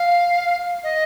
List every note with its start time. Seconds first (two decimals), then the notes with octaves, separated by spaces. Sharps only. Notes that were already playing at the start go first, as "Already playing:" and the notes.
Already playing: F5
0.83 D#5